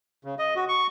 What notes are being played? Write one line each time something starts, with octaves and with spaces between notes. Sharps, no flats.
C#3
D#5
F#4
C#6